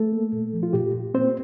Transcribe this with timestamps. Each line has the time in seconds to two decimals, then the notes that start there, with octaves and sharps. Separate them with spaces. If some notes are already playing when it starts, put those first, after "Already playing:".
Already playing: A3 A4
0.12 A#3
0.32 A#2
0.53 F3
0.63 F4
0.73 A#2 G4
0.94 A#2
1.14 A#3 C4 C5